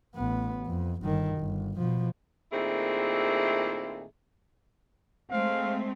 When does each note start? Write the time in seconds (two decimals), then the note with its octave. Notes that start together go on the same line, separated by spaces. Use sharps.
0.15 A1 B3
0.66 F2
1.02 G1 D#3
1.39 G1
1.77 B2 F3
2.51 A#2 D#3 A3 C4 E4 G#4
5.31 G#3 A3 C4 F5